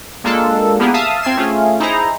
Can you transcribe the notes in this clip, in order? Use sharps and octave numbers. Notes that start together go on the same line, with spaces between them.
G#3 A#3 D4 F4 A4
A#3 B3 E4 G4 G#4
E5 F5 A5 D#6
C4 F4 G#6 C7 E7
A3 C#4 F4 G#4
D#4 E4 G#4 C5 A#5